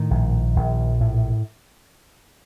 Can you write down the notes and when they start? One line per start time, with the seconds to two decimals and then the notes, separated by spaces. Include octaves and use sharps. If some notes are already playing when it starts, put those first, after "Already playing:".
Already playing: A2 D#3
0.11 A#1
0.56 A#1
1.01 A2